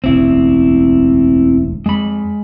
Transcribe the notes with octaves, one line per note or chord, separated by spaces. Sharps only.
E1 A1 D2 C4 E4
F2 G#3 B5